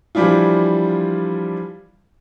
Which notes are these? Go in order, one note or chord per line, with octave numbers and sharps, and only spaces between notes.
E3 F3 G3 D4 E4 F4